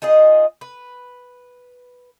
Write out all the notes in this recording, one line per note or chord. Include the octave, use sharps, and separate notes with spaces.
D#4 F4 G#4 D#5
B4